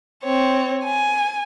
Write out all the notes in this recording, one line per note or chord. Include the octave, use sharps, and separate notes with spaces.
C4 C#5
G#5